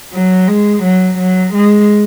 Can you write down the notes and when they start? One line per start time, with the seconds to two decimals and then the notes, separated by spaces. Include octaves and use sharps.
0.13 F#3
0.48 G#3
0.83 F#3
1.19 F#3
1.54 G#3